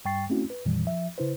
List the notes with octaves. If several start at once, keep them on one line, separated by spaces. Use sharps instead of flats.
G2 G3 G5 C#6 A6 C7
A3 C4 C#4 E4 F#4
B4
F2 A#2 D#3 E3 G3
F3 E5
C#3 E4 B4 C5